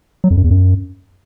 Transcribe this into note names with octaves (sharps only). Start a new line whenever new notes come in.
F#3
F2
F#2
E2
F#2